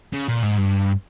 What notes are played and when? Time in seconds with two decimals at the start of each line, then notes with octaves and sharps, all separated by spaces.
0.13 C#3
0.28 A#2
0.43 G#2
0.58 G2